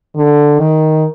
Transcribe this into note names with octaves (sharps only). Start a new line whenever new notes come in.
D3
D#3